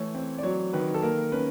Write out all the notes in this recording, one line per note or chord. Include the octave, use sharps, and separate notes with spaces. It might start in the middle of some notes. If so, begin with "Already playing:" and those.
Already playing: E3 A3 C#5
C4
D5
F#3 C#5
D#3 B4
A4
A#3 A#4
C#4 B4